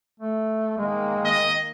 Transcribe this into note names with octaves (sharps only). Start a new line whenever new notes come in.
A3
D#3 G#3 A#3
D#5